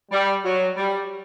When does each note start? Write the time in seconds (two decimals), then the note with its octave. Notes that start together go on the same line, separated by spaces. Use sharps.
0.11 G3
0.44 F#3
0.77 G3